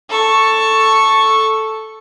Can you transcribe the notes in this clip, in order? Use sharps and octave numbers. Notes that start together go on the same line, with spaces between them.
A4 C#6